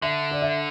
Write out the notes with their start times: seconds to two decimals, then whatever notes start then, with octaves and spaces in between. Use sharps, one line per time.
0.02 D3 E5
0.31 D5
0.42 E5